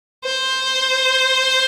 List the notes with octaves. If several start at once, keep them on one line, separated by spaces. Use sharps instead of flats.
C5